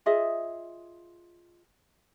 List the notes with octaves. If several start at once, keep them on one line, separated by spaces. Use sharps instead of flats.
F4 G#4 D#5 E5